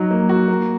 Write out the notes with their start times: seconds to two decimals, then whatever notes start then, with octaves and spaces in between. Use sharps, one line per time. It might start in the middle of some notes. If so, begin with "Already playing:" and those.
Already playing: F#3 D#4
0.11 A#3
0.29 F#4
0.48 A#3